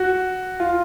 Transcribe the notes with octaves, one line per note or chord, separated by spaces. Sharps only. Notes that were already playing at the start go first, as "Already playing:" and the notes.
Already playing: F#4
F4